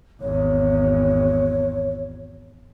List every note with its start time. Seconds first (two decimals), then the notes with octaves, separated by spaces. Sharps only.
0.21 G#1 E2 C#5